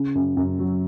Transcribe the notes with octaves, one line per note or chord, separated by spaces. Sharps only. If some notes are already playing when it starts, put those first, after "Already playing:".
Already playing: C#3
F#2
F#2
F#3